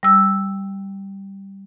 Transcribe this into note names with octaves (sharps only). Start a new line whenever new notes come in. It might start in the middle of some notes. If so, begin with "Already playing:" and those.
G3 E6